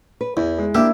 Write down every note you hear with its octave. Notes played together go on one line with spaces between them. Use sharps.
B4
E2 E4
G#3
A#3 D4 E4 G4 E5 E6